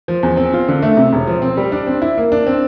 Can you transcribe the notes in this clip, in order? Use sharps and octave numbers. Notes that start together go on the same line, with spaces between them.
F3
E2
C4
F4
D3
A3
C3
E1
F3
C4
G3
D4
C4
E4
A#3
D4
C4